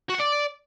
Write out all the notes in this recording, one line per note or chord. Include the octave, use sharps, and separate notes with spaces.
F#4
F#5
D5